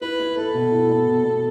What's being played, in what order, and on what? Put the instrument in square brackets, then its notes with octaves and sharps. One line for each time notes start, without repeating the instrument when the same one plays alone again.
[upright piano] E4 [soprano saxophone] B4
[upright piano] E4
[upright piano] E4 [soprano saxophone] A4
[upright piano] B2
E4
B3
B2
B3